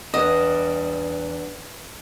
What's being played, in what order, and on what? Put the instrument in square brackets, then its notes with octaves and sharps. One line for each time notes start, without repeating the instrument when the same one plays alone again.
[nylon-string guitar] E2 [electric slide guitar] D4 B4 [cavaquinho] D#5